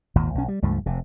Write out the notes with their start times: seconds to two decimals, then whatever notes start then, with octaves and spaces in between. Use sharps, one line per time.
0.15 G#1 D#2 A#2
0.35 B1 C#4
0.48 G3
0.62 C#2 G2 F3 A3
0.86 F1 C3